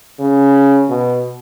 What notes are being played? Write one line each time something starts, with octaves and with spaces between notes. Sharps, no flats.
C#3
B2